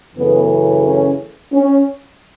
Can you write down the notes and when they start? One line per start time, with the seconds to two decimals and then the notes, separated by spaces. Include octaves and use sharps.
0.15 F#2 C#3 E3 A3 B3
0.85 C#4
1.52 C#4